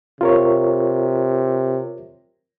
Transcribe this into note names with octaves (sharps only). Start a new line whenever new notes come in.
C3 F4 A#4 C#5